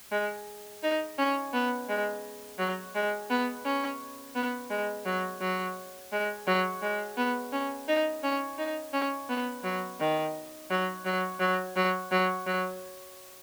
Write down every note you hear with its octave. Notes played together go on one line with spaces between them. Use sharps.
G#3
D#4
C#4
B3
G#3
F#3
G#3
B3
C#4
B3
G#3
F#3
F#3
G#3
F#3
G#3
B3
C#4
D#4
C#4
D#4
C#4
B3
F#3
D#3
F#3
F#3
F#3
F#3
F#3
F#3